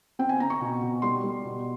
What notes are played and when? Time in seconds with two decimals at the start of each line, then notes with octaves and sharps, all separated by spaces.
0.19 C4 G5
0.29 G#5
0.40 C4 A#5
0.50 C#6
0.60 B2
0.81 B2
1.02 G3 C6
1.24 G3
1.44 B2